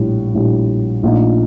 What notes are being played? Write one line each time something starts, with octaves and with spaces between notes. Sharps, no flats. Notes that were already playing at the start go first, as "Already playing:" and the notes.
Already playing: A#1 A2 G3
A#1 A2 G3
A#1 A#2 A3 D#4